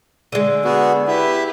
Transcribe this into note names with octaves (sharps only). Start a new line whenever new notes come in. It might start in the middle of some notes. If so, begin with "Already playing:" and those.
D3 G#3
B3 F#4 G#4
E4 G4 B4